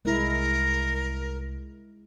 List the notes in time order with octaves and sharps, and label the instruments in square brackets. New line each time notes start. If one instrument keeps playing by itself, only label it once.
[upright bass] C2 [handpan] G#3 E4 [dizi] A#4